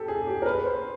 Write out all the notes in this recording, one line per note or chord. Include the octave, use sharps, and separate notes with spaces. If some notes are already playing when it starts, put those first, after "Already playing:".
Already playing: G4 A4
G#4
G4
A#4
B4
C5